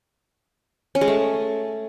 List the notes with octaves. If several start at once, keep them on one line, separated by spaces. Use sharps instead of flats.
C#4
G#3
A3